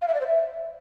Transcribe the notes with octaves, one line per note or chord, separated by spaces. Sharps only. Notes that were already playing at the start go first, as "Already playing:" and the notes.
F5
E5
D5
C5
E5